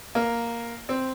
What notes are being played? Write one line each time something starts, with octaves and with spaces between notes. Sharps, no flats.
A#3
C4